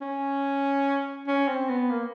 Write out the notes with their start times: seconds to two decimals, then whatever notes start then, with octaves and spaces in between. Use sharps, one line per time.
0.02 C#4
1.28 C#4
1.48 C4
1.69 B3
1.91 A#3